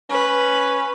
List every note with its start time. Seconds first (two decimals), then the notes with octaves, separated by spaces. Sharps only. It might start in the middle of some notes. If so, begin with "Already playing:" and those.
0.10 C#4 B4